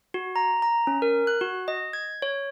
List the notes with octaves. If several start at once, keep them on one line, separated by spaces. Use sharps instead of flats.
F#4
A#5
A#5
C#4
A#4
F#6
F#4
D#5
G#6
C#5